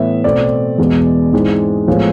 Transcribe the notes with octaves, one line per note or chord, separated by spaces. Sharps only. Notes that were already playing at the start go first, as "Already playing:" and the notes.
Already playing: A2 E3 B3 E5
B2 A3 C4 D5
E2 B2 G#3 B3
G#2 E3 G#3 C4
A2 F3 G#3 B3